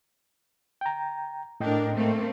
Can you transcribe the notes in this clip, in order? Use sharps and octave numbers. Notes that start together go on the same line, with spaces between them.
G5 A#5
A2 D4 A#4 D#5 G5
A3 A#3 C4